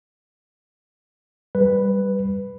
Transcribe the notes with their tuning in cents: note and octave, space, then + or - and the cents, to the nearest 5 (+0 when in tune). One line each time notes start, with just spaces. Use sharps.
G3 +0 B4 +0